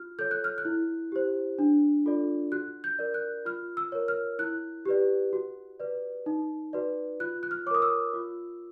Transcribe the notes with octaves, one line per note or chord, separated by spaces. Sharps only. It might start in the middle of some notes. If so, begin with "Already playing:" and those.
Already playing: F4 F6
A4 C#5 G6
F#6
F6
F#6
E4
G4 C5
D4
F4 A4 D5
F#4 F#6
G6
A#4 D5
F#6
F4 F6
E6
A#4 C#5
F6
E4 F#6
G4 B4 D5
F#4
B4 D5
D#4
F#4 B4 D5
F4 F#6
F#6
F6
A#4 C#5 D6 D#6
E6
F4